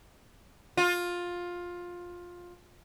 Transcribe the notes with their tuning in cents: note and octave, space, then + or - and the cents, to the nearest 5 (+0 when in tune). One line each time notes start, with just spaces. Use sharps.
F4 +15